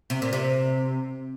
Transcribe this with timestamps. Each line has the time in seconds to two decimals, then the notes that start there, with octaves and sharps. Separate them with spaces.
0.10 C3
0.22 A#2
0.33 C3